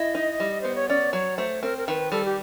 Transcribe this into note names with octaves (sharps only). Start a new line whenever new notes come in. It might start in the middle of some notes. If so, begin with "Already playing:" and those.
Already playing: E4 D#5
D#4
G3
B3 C5
C#5
C#4 D5
F#3 C#5
A3 C5
C4 A#4
A#4
D#3 B4
G3 A4
G4